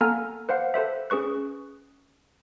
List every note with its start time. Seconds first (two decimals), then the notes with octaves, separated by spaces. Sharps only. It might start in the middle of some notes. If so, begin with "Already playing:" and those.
0.01 A#3 B3 A4 G#5 A#5 F6
0.49 B4 C5 F5 F#5
0.74 A4 B4 C5 E5
1.10 C#4 G#4 B4 C#6 F#6